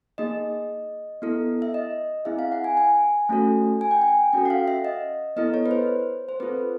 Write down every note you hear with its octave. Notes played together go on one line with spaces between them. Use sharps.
A#3 D#4 G#4 D#5
B3 E4 A4
E5
D#5
C4 E4 G#4 E5
F5
F#5
G#5
G#5
A3 C#4 F#4 A4
G#5
G5
G#5
C#4 F#4 A4 G5
F#5
F5
E5
D#5
B3 E4 A4 D#5
C#5
B4
C5
C5
C4 F4 A4 B4